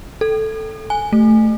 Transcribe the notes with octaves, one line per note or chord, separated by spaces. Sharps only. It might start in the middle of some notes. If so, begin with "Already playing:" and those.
A4
G#5
A3